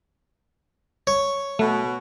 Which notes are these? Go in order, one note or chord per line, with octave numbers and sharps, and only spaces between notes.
C#5
B2 A3